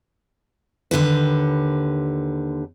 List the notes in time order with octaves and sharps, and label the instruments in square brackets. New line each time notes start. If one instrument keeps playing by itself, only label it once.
[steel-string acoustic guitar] D#2 D3 G4 B4